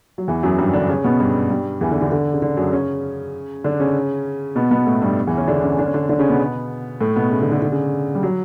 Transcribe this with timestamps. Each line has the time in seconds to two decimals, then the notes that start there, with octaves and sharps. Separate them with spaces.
0.18 F#3
0.28 E2 E3
0.43 F#2 F#3
0.58 G2 G3
0.74 D3 D4
0.89 C#3 C#4
1.04 B2 B3
1.20 G2 G3
1.50 G2 G3
1.81 E2 E3
1.91 D3
2.01 D3
2.12 D3
2.33 C#3
2.42 D3
2.57 F#2 F#3
2.73 C#3 C#4
3.64 D3 D4
3.80 C#3 C#4
4.56 B2 B3
4.71 B2 B3
4.86 A2 A3
5.02 G2 G3
5.27 E2 E3
5.37 C#3 C#4
5.48 D3 D4
5.63 C#3 C#4
5.78 D3 D4
5.86 C#4
5.94 D3 D4
6.09 D3 D4
6.19 C#3 C#4
6.29 B2 B3
7.01 A2 A3
7.16 B2 B3
7.31 C#3
7.42 D3
7.52 D3
7.62 D3
7.72 C#3
8.15 G3
8.23 F#3